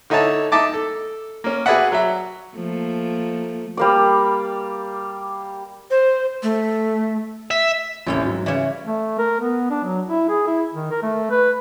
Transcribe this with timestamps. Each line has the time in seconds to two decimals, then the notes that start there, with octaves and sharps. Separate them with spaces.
0.10 D3 D#4 E4 C#5 A5
0.52 D#4 E5 A5 D6
0.74 A4
1.44 A#3 C#4
1.66 F#4 G#4 B4 D5 E5 F#5
1.92 F#3 E5
2.55 F3 A3 A#3
3.77 G3 A#3 D5
5.91 C5
6.43 A3
7.51 E5
8.07 A1 D#2 C3 G3 C#4 G5
8.24 G#2 F#3
8.46 C#3 E3 C#5 D5
8.84 A3
9.18 A#4
9.40 B3
9.70 D4
9.84 F#3
10.08 E4
10.29 G#4
10.47 E4
10.74 D#3
10.91 A#4
11.02 A3
11.30 B4